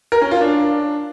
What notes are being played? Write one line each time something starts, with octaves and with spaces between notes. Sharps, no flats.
A#4
C#4
F4
D4